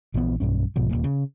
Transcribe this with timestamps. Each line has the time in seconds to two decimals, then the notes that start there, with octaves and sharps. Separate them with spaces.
0.14 A#1 E3 F3 B3
0.40 B1 G2 C#4
0.76 B1 G#2 B2 F3
0.91 D#1 G#1 A#2
1.04 C#3